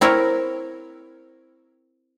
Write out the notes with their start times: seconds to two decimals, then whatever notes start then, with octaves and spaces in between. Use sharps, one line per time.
0.01 C4 E4 A#4 C#5